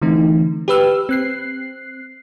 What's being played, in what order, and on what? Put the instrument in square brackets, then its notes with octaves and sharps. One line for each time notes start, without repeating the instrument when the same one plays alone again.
[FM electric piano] D3 E3 A3 C4 D#4
G4 B4 E6 F6
C4 F#6 C7